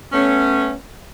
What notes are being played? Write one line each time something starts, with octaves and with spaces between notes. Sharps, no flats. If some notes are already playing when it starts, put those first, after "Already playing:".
A3 B3 C#4